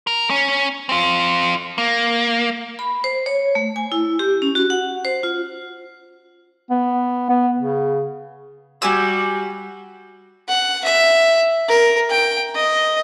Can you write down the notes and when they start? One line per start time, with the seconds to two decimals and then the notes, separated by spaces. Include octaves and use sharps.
0.07 A#4
0.30 C#4
0.89 C4 F4
1.78 A#3
2.79 B5
3.04 C5
3.26 C#5
3.55 A3
3.76 G#5
3.92 E4
4.19 G4
4.42 C#4
4.55 F#4
4.70 F#5
5.05 C5
5.23 F4
6.70 B3
7.30 B3
7.57 C#3
8.82 G3 F#4 G4 G#5 E6
10.49 F#5
10.85 E5
11.69 A#4
12.10 G5
12.55 D#5